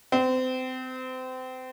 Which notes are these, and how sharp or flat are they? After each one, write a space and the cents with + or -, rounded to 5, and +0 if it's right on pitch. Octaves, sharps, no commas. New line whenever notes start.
C4 -30